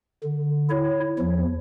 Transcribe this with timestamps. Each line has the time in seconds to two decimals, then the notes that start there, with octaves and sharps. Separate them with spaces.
0.23 D3
0.70 E4 C#5
1.19 E2 F3